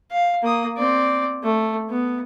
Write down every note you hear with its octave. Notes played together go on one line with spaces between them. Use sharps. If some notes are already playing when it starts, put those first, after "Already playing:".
F5
A#3 D#6
C4 D5
A3
B3